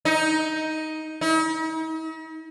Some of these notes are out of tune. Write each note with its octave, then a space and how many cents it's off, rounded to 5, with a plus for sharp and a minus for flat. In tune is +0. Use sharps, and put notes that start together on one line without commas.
D#4 +10
D#4 +45